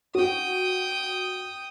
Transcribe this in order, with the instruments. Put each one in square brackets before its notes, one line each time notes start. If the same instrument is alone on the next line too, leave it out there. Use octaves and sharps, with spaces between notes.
[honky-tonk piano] F#4 [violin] G5 D#6